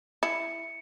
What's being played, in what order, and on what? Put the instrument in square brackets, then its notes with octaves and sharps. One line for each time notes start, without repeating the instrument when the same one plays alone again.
[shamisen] E4 [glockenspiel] C#7